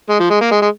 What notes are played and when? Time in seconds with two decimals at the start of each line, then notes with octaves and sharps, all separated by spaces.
0.09 G#3
0.20 F3
0.30 G#3
0.41 A#3
0.51 G#3
0.62 G#3